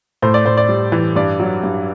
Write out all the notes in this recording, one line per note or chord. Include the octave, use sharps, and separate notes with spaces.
A2 C5
D5
A2 C5
D5
G3
E3
G2 D5
F#3
G2